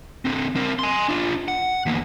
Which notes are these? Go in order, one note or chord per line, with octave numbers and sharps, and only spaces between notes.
D3 C4
C4 A#4
G#5 C6
D4 F4
F#5
E2 A#3